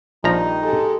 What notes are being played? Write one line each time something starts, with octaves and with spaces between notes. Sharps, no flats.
A#1 D#3 F3 G3 D#4 A#5
G#3 G4 A4